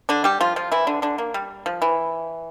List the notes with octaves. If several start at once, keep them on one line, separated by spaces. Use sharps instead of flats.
D3 D4
G3 G4
F3 F4
F3 F4
E3 E4
D3 D4
D3 D4
A#3
G3
F3
E3